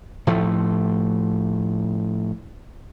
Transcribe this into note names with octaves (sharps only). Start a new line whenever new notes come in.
A2 F3 A3